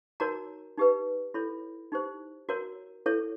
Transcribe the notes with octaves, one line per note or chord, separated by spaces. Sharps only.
D#4 F#4 A#4 C#5 A#5
D#4 G4 B4
E4 A4 C#5 B5
D#4 G4 C5
F#4 A#4 C#5 A#5
E4 A4 C#5